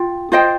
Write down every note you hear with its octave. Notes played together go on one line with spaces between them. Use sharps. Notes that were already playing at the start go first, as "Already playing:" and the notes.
Already playing: F4 G5
F4 C5 D#5 G5